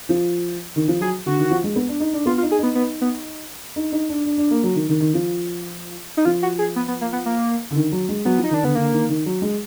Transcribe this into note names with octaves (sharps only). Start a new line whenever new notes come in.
F3
D#3
F3
F#3 G#4
D3 F#4
D#3
F3
G#3
B3
D4
D#4
D4
B3 F4
F4
D#4
G#4
B3 D#4
B3
B3
D#4
D#4
D4
D4
D4
A#3
F#3
D#3
D#3
D#3
F3
D#4
F3 F4
F#4
G#4
B3
B3
A#3
B3
A#3
D3
D#3
F#3
G#3
F#3 B3
F3
D#4
D#3 D4
D3 B3
D3 A#3
D#3
D#3
F#3
G#3